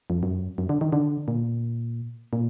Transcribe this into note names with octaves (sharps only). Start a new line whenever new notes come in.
F2
F#2
F#2
D3
D#3
D3
A#2
A#2